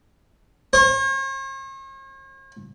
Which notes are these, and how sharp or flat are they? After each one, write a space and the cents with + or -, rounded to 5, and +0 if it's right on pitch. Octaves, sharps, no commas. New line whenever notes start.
C#5 -45